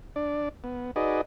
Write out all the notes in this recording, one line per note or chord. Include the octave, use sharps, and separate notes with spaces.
D4 D5
B3
D#4 F#4 G#4 B4 D5 D#5